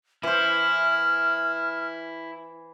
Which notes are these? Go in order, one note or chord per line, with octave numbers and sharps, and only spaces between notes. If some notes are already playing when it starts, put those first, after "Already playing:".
E3 E4 C5 F6